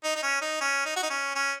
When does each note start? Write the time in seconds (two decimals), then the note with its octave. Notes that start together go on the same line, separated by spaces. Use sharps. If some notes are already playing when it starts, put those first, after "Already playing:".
0.04 D#4
0.16 D#4
0.23 C#4
0.42 D#4
0.61 C#4
0.86 D#4
0.96 F#4
1.03 D#4
1.10 C#4
1.35 C#4